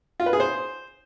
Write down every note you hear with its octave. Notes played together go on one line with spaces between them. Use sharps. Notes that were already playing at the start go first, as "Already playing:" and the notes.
F4
B4
G#4
C5